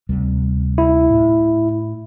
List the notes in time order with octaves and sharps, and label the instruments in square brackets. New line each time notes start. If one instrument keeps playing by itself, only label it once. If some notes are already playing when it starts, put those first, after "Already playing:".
[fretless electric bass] D2 C3 G3
[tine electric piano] E4
[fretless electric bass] A2